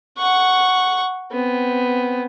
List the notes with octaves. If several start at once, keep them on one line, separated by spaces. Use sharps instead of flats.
F#5 C#6
B3 C4